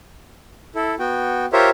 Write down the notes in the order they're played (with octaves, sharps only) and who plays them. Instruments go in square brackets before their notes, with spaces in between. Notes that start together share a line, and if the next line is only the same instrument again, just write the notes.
[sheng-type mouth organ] E4 A4
B3 F#4 G5
F4 G4 A#4 C5 C#5 E5